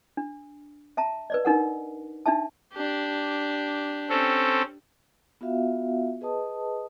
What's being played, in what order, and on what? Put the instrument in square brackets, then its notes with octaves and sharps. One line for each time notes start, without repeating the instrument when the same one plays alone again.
[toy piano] D4
E5 A5 A#5
B4 D5 D#5
D4 D#4 A#4 F#5
D4 D#4 E5 A5
[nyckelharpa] D4 G4
[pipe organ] C4 C#4 A4
[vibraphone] B3 F4 F#4 E5 F5
G#4 B4 D#5 A5 D#6